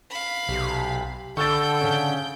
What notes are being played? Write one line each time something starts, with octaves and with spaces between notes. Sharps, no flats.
F5 B5
B1 C3
D3 A4 G5 C#6 E6 G6 A6
C#3 C#4